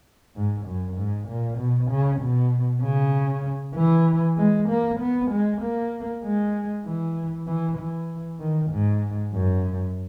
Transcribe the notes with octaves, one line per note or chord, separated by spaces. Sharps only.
G#2
F#2
G#2
A#2
B2
C#3
B2
C#3
E3
G#3
A#3
B3
G#3
A#3
G#3
E3
E3
E3
D#3
G#2
F#2